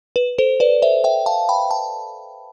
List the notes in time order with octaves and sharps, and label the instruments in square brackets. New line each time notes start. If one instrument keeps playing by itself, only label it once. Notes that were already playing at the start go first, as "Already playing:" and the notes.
[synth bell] B4
A4 C5
B4 D5
C5 E5
E5 G5
F5 A5
G5 B5
A5